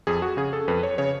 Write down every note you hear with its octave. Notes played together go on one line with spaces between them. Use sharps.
F2 G#4
F#4
C#3 G#4
A4
F2 B4
C#5
C#3 C#5